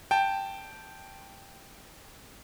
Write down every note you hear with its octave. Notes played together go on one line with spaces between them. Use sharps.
G5 A5